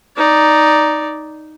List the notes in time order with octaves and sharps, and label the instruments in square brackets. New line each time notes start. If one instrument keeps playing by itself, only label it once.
[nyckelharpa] D#4 D5